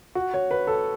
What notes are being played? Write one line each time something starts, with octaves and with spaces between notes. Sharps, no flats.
F#4
C#5
B4
A4